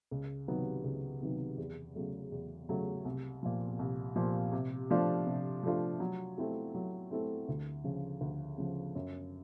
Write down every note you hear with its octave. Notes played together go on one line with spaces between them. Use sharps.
C#2
C3 D#3 F#3 B3
C#2
C3 D#3 F#3 B3
E2
C#3 F#3 A3
E2
C#3 F#3 A3
C2
A#2 F3
C2
A#2 F3
C3
F3 A3 D4 F4
C3
F3 A3 D4 F4
F#3
A3 C4 E4 A4
F#3
A3 C4 E4 A4
D2
C#3 F3
D2
C#3 F3
F#2